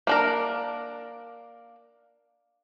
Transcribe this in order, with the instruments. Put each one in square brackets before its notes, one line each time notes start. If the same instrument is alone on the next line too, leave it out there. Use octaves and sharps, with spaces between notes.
[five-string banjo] A#3 D4 A#4